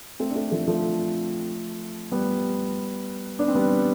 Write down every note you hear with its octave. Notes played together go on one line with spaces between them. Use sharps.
A3 C4
D4
A3 C4
F3 A3
F3 A3
G3 B3
B3 D4
C4
G3 B3